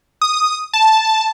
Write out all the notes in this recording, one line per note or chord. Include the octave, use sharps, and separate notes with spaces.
D#6
A5